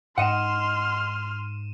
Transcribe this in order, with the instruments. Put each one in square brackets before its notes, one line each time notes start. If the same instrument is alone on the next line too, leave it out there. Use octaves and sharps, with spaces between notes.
[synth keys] G#2 D#7 E7 [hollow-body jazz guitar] D#5 F#5 [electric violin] C6 F6